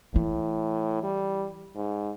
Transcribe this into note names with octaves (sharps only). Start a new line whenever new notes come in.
A2 E3 E4
G3
G#2